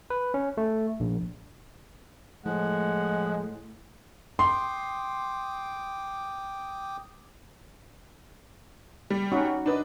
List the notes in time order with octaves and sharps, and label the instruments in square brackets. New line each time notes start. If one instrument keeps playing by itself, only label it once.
[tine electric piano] B4
C#4
A3
A#1
[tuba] A2 [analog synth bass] F3 [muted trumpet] G#3 [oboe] F#5
[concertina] G5 D6 D#6 [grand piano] C6
[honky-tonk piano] G3
[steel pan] C#4 D#4 F#4
[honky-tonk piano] D4 B4 D#5